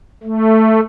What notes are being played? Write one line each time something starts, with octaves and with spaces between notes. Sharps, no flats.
A3